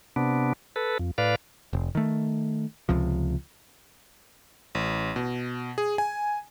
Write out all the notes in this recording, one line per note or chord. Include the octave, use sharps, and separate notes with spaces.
C3 B3 D4
A4 B4
F2
A2 B4 D5 F5
F1
D#3 A3
C#2 C3 F3
A1
B2
G#4
G#5